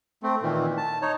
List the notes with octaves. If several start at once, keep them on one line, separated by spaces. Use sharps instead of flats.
A3 C4
A#2 D#3 E3
A5
D#4 C#5